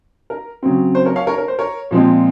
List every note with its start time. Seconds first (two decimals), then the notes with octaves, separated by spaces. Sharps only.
0.30 A#4
0.63 C#3 F#3 C4
0.95 C5
1.05 A#4 C#5
1.16 C#5 F5
1.27 A#4 C#5
1.38 A#4
1.48 C5
1.59 A#4 C#5
1.91 A#2 F3 G#3 C4